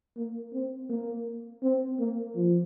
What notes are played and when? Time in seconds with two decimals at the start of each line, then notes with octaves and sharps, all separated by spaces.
0.17 A#3
0.53 C4
0.90 A#3
1.63 C4
1.99 A#3
2.35 F3